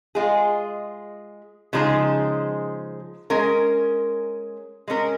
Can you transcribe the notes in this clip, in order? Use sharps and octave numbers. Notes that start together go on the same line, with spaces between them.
G#3 F4 G#4
C#3 F3 G#3 D#4 G#4
G#3 C#4 A#4
G#3 C#4 A#4